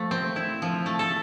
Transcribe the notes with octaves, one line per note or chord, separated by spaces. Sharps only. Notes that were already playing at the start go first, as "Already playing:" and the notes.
Already playing: F3 A3
C4
E4
F3
A3
A4